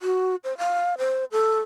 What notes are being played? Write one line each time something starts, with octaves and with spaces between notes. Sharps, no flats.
F#4
C5
F5
C5
A4